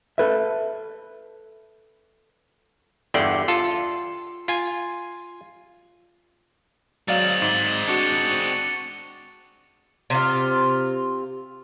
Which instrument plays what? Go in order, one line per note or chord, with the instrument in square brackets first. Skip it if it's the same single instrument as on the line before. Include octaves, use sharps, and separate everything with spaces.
[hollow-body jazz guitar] A4 B4 E5
[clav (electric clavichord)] G1 E2 D3 D5 G5
F4 A4
F4 G#5
[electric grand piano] F#3 D5 F5 [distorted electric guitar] G#3 C4 [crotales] A6 F#7
[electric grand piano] G#2 [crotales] A6 F#7 G7
[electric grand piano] D4 F#4 [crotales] C#6 D6 C#7
[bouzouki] C3 F4